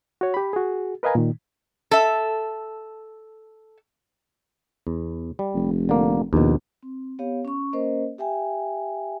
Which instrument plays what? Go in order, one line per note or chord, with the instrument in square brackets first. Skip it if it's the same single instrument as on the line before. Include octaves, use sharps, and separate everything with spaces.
[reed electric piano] F#4 C#5
G4 B5
F#4 G#4
A#4 B4 D#5 F5 G#5 A#5
A#2 D#3
[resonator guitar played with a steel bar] A4 E5
[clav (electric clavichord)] E2
G3
[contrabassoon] F1
[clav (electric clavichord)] D3 A#3
[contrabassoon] A#1 [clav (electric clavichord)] D#2 B2
[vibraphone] C4
B3 G4 C#5 F5
C#4 C#6
A#3 C#4 A#4 C5 D#5
G4 E5 G5 G#5